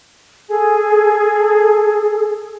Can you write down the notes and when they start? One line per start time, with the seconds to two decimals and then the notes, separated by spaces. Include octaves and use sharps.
0.48 G#4 A4